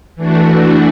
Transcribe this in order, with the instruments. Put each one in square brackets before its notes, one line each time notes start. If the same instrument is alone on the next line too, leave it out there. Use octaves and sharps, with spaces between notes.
[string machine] E3 A3 D4 F#4